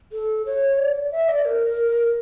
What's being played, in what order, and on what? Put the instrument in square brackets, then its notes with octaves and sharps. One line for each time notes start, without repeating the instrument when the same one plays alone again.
[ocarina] A4
C#5
D5
E5
D5
A#4